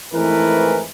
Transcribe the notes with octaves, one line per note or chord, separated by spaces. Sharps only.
F2 G#2 E3 A3 A#4 B4